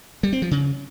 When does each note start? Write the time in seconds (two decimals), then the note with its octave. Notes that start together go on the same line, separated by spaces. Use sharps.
0.23 G3
0.33 C4
0.42 F3
0.51 C#3